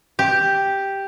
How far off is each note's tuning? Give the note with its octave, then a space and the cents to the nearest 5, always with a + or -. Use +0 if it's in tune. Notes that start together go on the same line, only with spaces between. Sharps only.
G4 +0